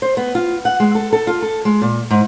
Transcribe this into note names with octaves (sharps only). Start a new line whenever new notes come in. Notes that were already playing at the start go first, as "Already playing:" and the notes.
C5
B3
F4
F#5
G#3
A4
A4
F4
A4
G#3
A#2
G#2